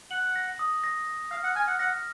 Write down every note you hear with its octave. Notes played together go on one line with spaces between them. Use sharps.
F#5 F#7
A#6
D#6
A#6
A#6
F5 F6
F#5
G#5 F6
F#5
F#5 A#6